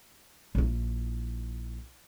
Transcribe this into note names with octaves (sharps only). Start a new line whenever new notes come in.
A#1 E4